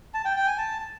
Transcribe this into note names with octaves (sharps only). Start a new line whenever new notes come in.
A5
G5
G5
G#5
A5